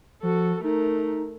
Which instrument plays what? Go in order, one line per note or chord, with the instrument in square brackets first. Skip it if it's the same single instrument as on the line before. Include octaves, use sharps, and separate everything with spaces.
[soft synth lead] F3 [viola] F#4 A4
[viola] A3 A#4 [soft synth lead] D#4